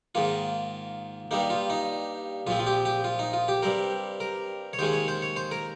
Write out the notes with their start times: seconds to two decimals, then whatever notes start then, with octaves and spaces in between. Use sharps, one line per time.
0.15 G#2 D#3 A#3 F4
1.31 G2 G3 A#3 D#4
1.50 F4
1.70 D#4
2.47 A#1 A#2 F3 C4 F4
2.59 F4
2.67 G4
2.85 G4
3.04 F4
3.19 D#4
3.33 F4
3.48 G4
3.63 G2 G3 C4 A#4
4.20 A#4
4.73 C#5
4.79 D#2 D#3 G#3 C#4 C5
4.93 C#5
5.08 C5
5.22 C#5
5.36 C5
5.51 A#4